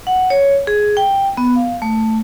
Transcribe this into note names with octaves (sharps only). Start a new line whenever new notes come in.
F#5
C#5
G#4
G5
B3
F5
A3